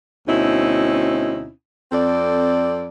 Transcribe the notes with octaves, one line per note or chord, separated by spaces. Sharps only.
D2 B2 C4 C#4 D#4 E4
F2 C4 A4 D5